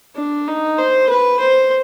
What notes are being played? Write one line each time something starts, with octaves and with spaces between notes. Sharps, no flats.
D4
D#4
C5
B4
C5